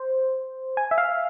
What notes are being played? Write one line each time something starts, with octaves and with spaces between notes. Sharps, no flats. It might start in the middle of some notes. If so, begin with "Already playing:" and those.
Already playing: C5
G#5
E5
F5